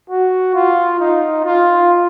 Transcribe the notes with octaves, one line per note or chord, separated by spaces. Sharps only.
F#4
F4
D#4
F4